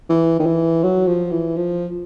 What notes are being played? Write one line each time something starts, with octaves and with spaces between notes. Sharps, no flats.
E3
D#3
E3
F#3
F3
E3
F3